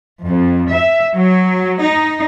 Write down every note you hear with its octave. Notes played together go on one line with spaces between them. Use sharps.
F2
E5
F#3
D#4